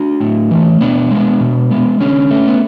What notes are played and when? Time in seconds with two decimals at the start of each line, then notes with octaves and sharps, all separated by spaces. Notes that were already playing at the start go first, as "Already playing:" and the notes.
Already playing: D4 F#4
0.21 A2
0.51 E3 A3
0.81 B2 B3 D4
1.11 G#3 B3
1.40 B2
1.71 G#3 B3
2.00 D3 C#4
2.31 A3
2.48 B3